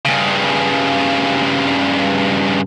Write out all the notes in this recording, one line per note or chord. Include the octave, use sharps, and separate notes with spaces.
G2 C#3